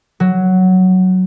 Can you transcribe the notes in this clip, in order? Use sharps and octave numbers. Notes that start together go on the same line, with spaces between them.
F#3